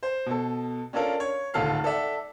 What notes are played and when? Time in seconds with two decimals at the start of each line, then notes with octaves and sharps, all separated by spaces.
0.03 C5
0.26 B2 A4
0.93 C#4 D4 F4 A4 A#4
1.20 C#5
1.54 D1 G#1 F4 A4 F6 C7
1.84 A4 D5 E5 F#5